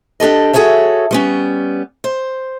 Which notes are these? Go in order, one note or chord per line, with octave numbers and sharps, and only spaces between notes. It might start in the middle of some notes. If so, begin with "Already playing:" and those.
D4 G4 A4 D#5
F#4 G#4 A4 C#5 E5
G3 B3 C#4
C5